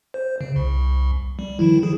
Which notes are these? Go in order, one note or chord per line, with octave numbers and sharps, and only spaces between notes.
C5
C#3
C2
G3
D#3 F3 E4
F3 G#4